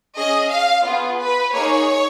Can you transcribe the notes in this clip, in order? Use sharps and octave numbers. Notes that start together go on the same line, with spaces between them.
C#4 G#4 D#5
F5
B3 F4 G#4
B4
A#3 D#4 G#4 C#5